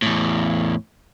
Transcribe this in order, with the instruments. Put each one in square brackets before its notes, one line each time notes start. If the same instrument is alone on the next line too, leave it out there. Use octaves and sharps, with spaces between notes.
[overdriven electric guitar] E2 A2